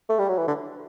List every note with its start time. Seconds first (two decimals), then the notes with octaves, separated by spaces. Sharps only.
0.09 A3
0.19 G3
0.29 F#3
0.38 E3
0.48 D3